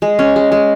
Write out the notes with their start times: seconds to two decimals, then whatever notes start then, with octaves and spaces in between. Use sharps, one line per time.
0.02 G#3
0.19 C#4
0.36 G#3
0.52 G#3